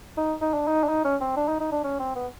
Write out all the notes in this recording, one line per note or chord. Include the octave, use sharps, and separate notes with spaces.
D#4
D#4
D4
D#4
D4
D#4
C#4
C4
D4
D#4
D#4
D4
C#4
C4
B3